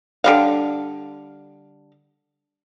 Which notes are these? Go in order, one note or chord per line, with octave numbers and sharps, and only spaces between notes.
D3 G3 F5